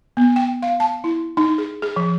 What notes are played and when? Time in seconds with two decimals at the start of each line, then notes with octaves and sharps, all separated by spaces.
0.17 B3
0.36 G5
0.63 F5
0.80 A5
1.04 E4
1.37 D#4
1.58 G#4
1.82 G#4
1.96 F3